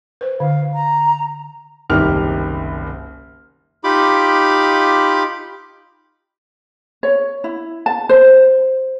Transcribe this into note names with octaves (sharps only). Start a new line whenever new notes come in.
B4 C5
D3 F5
A#5
F#1 C2 D#3 G4 F6 F7
D#4 F4 G4 B5 D6
C#5
E4
A5
C5